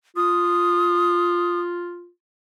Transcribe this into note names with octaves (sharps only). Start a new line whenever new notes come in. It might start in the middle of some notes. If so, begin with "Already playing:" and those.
F4 D#6